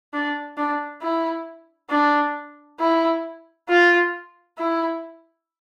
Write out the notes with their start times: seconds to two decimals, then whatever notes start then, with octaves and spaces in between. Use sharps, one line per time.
0.13 D4
0.58 D4
1.02 E4
1.90 D4
2.80 E4
3.69 F4
4.58 E4